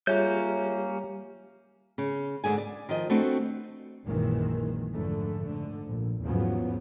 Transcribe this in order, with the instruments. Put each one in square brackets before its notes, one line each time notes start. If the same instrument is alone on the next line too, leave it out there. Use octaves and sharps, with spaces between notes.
[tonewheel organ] G3 [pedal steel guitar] A#3 C#4 G6 [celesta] F4 G#4 E5 [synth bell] C#5
[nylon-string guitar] C#3
G#2 D3 G#4 G#5
D5
D#3 F3 D#5
A3 C4 D4 F#4 B4
[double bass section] A#1 F#2 A#2 D#3 E3 G#3
F2 G#2 D3 A3
G#2 D3
A#1
E2 G#2 C#3 F3 F#3 B3